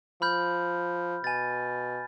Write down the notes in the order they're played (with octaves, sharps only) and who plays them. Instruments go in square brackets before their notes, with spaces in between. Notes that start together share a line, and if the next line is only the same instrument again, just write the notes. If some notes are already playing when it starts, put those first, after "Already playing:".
[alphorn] F3 [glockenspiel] B5 F6 G6
[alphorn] B2 [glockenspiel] G#5 A6